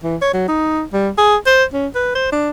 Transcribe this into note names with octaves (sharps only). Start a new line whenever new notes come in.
E3
C#5
F#3
D#4
G3
G#4
C5
C#4
B4
C5
D4